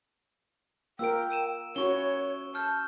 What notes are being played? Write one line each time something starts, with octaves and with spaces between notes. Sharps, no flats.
A#3 F4 A#4 G5 E6 D7
E6 D#7 E7
C#4 E4 F#4 C#5 C#6 G7
A5 F6 G6